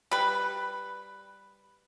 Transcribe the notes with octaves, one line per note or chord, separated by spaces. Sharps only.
G3 B4